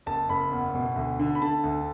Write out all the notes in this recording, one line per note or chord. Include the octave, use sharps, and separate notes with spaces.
F#1 A5
F#1 B5
E2
B2
D2
D3
B5
D3 A5
D2